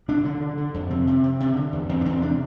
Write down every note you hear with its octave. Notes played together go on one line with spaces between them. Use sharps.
C3 D4
D3
D3
D3
F2
C3 C4
C3
C3
C3
D3
E2
E2 C4
D4
E2 C4
C3 D4